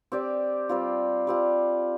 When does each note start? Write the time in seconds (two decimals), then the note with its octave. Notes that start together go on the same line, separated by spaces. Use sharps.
0.12 C4 G4 D5
0.69 G3 C4 F4
1.27 G3 C4 F4